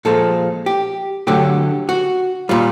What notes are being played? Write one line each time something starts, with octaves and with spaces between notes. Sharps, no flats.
A#2 F3 G#3 A4
G4
D3 F#3 A3 G4
F#4
A#2 G3 F4